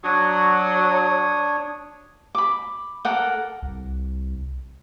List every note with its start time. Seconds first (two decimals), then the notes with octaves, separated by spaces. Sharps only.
0.04 F#3 D4 C#5 D#6
2.35 B5 D6
3.05 A4 A#4 F#5 D6
3.62 C2